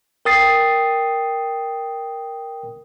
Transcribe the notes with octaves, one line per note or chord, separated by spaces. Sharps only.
A#4 G5 D#6 A6 C7